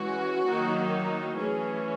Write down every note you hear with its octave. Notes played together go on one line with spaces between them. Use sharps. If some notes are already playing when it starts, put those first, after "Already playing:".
Already playing: E3 G#3 C#4 F#4
D#3 F#3 A#3 D#4
E3 A3 C#4 G#4